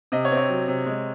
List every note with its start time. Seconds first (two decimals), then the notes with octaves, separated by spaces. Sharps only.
0.12 C3 D#5
0.25 C#5
0.31 C4
0.37 C#5
0.49 F#3
0.68 C3
0.86 G#3